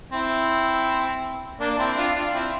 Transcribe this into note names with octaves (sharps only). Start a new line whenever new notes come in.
C4 E4
A#3 D4
C4 E4
D4 F4
D4 F4
C4 E4